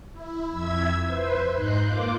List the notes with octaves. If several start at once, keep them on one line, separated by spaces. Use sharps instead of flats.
E4
F2 E5 E6 G#6
B4 C5
G#2 D#4 C6 F#6 G6
A#3 F4 D6